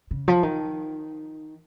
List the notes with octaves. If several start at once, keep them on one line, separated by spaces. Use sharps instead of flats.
C#3
F3
D#3